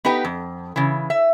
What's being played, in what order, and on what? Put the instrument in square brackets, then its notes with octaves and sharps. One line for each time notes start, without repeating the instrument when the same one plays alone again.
[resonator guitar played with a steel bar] B3 D#4 G4 B4 G5
F2
C#3 E3
E5